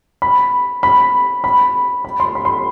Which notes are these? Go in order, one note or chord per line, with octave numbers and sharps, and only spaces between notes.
B5
B5
B5
B5
C6
B5
C6